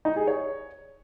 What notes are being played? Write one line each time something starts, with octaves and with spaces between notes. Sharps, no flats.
D#4
G#4
C#5